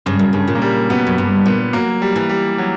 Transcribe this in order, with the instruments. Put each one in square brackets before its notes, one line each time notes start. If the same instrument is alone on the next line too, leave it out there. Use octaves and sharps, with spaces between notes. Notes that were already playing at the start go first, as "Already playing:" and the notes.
[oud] G2 [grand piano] C#3
[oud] F#2
[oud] G2 [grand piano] C#3
[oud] A#2
[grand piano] A#3
G3
[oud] B2 [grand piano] B3
[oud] F#2
[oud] G2 [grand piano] B3
[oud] A#2 [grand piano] B3
[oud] F#3 [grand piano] A#3
[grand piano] G3
[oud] E3
[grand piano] G3
F#3